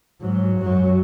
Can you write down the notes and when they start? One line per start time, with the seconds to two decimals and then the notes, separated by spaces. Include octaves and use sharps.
0.20 G#2 F#3
0.59 F#2 F#3